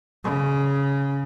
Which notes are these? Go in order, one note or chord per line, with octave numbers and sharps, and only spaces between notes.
C#3